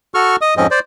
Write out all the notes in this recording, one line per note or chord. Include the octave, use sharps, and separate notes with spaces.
F#4 A4 C#6 F6
D#5 D#6
F2 G#2 F3 C4 C#4 D#5
C5 D5